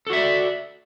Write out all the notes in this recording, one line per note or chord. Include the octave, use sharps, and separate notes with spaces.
F#4 A4 D5 E5